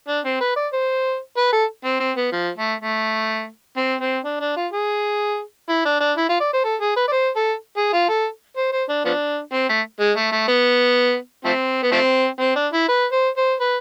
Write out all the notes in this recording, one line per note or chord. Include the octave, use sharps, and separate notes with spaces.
D4
C4
B4
D5
C5
B4
A4
C4
C4
B3
F3
A3
A3
C4
C4
D4
D4
F4
G#4
E4
D4
D4
E4
F4
D5
C5
A4
G#4
B4
D5
C5
A4
G#4
F4
A4
C5
C5
D4
F3 B3 D4
C4
A3
G#3
A3
A3
B3
F3 A3 C4
B3
F3 A3 C4
C4
D4
E4
B4
C5
C5
B4